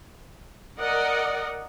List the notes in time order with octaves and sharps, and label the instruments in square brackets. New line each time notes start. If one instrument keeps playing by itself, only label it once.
[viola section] A#4 D5 D#5 F#5